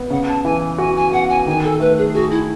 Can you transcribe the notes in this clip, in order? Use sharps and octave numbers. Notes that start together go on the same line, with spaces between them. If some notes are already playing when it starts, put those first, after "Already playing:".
Already playing: B3
C#3 F#5
A5
E3 G#5
F#4 G#5
G#5
B3 F#5
G#5
D#3 G#5
A4
A3 B4
G#4
F#4 G#4
E4